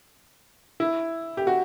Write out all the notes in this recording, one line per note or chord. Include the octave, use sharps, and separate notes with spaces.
E4
G4
F#4